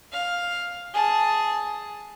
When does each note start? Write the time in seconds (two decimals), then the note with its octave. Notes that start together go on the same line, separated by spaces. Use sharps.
0.12 F5
0.94 G#4 A5